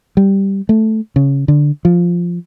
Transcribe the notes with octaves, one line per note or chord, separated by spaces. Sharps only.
G3
A3
C#3
D3
F3